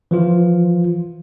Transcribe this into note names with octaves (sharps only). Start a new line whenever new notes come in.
E3 F3 F4